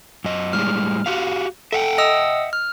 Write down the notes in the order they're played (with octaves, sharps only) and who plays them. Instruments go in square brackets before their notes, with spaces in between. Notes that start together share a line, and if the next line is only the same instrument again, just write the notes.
[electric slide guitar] F#2 D#5
[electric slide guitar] A2 G3 G#3 [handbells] F6
[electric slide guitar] F#4 G4 F5
[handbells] A4 [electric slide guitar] E5 F#5 G5
[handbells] D#5 D#6 E6
F6